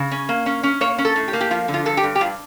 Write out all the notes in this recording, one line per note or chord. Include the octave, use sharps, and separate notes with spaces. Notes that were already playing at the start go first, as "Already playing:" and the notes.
Already playing: C#3
C#4
A#3
C#4
C#4
A#3 C#5
C#4
A4
A2
G4
A#3
G4
F3 F4
D3
F4
G2 A4
G4
G2
G4
G2 F4